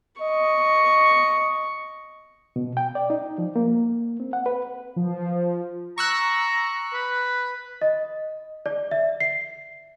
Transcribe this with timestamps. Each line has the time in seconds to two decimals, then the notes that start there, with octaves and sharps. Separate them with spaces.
0.21 D#5 C#6
2.56 B2
2.77 G5
2.95 D5
3.10 D#4
3.38 F3
3.56 A#3
4.20 C4
4.33 F#5
4.46 B4
4.96 F3
5.98 A#5 C#6 E6 F#6
6.94 B4
7.82 D#5
8.66 D5
8.91 E5
9.20 C7